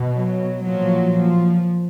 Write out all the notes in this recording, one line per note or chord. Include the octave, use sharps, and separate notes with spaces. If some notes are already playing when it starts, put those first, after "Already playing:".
Already playing: B2
F#3
A#2 F3 F#3
F3